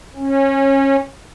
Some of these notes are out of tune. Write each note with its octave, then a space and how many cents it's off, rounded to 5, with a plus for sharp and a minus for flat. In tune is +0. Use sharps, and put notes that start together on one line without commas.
C#4 -25